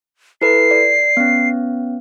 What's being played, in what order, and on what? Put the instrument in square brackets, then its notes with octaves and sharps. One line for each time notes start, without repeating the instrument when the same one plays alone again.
[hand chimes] E4 A4 B4 [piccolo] C7
[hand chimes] D5
B3 C#4